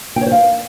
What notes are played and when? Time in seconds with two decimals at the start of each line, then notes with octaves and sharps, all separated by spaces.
0.16 G5
0.21 C#5
0.26 C5
0.32 F5